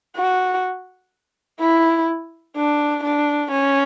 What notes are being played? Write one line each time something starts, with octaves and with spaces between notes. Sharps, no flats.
F#4
E4
D4
D4
C#4